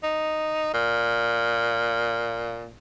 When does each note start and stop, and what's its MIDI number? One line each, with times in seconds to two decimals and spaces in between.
0.03 0.73 63
0.74 2.72 46